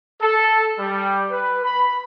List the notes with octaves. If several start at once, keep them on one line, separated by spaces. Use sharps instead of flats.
A4
G3
B4
B5